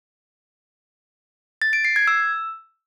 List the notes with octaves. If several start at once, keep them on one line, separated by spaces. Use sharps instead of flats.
A6
D7
C7
G#6
E6